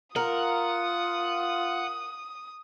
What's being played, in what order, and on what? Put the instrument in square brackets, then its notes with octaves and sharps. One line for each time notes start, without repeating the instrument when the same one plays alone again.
[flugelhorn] F4 [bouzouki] A#4 [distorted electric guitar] F#5 [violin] D#6